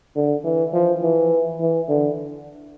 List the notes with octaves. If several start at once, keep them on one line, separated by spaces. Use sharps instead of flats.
D3
E3
F3
E3
E3
D3